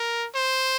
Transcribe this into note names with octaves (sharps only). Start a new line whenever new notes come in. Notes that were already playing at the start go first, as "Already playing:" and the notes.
Already playing: A#4
C5